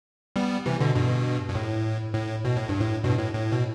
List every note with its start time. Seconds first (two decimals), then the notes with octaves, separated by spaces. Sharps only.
0.36 G3 B3
0.66 C3 E3
0.80 B2 D3
0.95 G2 B2
1.49 G2
1.55 A2
2.14 A2
2.45 B2
2.56 A2
2.69 G2
2.80 A2
3.04 G2 B2
3.18 A2
3.33 A2
3.52 B2